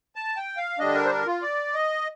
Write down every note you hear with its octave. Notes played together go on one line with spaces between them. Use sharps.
A5
G5
F5
D3 G3 D4 D#5
A#4
C5
A#4
F4
D5
D#5